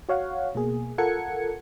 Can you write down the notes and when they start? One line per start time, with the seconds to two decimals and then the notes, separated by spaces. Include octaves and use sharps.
0.09 F#4 C#5 F5 F#5
0.55 B2 A#3 G#4
0.98 F4 A4 A#4 F#5 G#6 C#7